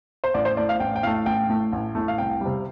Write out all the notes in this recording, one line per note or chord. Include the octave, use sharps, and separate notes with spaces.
C5
A1 D5
C5
A2 A3 D5
F5
A1 G5
G5
A2 A3 F5
A1 G5
A2 A3
A1
A2 A3
F5
C2 G5
C3 G3